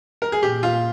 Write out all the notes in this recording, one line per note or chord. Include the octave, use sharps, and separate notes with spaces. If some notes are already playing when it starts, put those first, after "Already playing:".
A#4
G#4
A#2 G4
F4